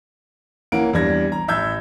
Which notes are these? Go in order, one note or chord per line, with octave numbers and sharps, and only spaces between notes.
E3 A#3 C#4 F#5 D7
E2 G3 D4 G#6 A#6
A#5
A1 E5 E6 G6 G#6